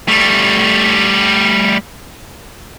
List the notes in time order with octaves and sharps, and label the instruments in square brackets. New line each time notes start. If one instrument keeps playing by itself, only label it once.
[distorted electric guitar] G3 A3